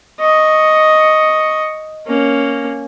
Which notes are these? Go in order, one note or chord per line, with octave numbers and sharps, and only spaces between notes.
D#5 C#6
A#3 C#4